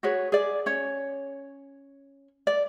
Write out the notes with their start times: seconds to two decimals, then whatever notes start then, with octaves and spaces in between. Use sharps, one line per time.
0.03 F#4 G#4 B4 C#5
0.32 G#4 D5
0.66 C#4 C#5
2.47 D5